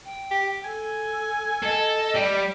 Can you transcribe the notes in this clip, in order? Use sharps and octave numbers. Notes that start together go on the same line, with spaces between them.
G5
G4
A4 G#5
A4 D#5
G3 G4